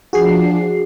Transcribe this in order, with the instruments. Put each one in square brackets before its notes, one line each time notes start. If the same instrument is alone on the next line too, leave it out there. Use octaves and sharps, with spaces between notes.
[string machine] F3 D4 [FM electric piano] F#4 G#4 C7